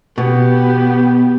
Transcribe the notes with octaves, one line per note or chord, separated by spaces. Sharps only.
B2 B3 G4